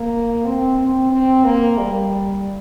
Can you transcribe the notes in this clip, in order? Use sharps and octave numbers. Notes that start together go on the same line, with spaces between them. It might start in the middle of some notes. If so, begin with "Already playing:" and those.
Already playing: A#3
C4
C4
C4
A#3
G3